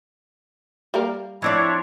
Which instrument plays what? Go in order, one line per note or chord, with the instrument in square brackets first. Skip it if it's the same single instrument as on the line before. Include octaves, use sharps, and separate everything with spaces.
[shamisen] G3 A#3 A#4
[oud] F3 C4 D5 [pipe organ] D4 E4 C#5